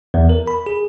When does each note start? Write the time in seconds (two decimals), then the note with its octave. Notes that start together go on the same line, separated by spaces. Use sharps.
0.14 E2
0.29 A#4
0.47 B5
0.66 G#4